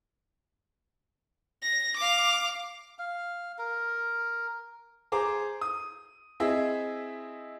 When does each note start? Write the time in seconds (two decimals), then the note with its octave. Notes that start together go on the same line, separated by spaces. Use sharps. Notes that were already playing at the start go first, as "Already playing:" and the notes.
1.63 A#6
1.97 F5 D6
2.99 F5
3.58 A#4
5.12 G#4 C5 A#5 D6
5.61 D#6
6.40 C4 E4 G#4 D#5 E5